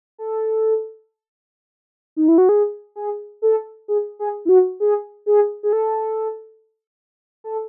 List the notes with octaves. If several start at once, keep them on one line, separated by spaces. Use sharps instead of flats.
A4
D#4
E4
F#4
G#4
G#4
A4
G#4
G#4
E4
F#4
G#4
G#4
G#4
A4
A4